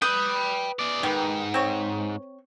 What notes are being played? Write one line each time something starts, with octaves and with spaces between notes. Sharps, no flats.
B4 G5 B5 D#6 G6
G#4 D5
G#2 D#3 B3 G4
C4 C#5